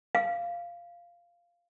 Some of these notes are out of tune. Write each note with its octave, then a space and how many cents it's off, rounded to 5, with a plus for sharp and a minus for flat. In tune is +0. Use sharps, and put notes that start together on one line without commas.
F5 -10